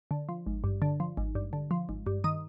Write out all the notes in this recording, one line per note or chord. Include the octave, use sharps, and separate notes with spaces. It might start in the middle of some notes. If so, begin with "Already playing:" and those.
D3
F3
G#1
G2
D3
F3
G#1
G2
D3
F3
G#1
G2
D#3 D#6